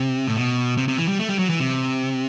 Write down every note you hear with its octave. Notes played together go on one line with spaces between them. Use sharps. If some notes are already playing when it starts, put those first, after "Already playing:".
Already playing: C3
A2
B2
C3
C3
E3
G3
A3
G3
F#3
E3
C3